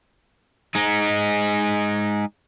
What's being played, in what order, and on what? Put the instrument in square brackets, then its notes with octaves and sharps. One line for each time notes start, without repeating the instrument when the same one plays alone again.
[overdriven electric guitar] G#3 D#4